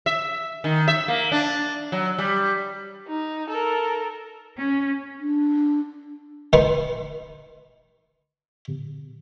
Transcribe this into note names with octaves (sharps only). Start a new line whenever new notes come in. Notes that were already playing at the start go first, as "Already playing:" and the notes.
E5
D#3
E5
A#3
D4
F#3
G3
D#4
A4 A#4
C#4
D4
D#3 D#4 B4 C6 C#6